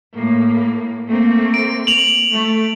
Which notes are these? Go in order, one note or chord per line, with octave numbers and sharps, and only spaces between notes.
A2 A#3
A3 A#3 C4
D7
F7 F#7
A3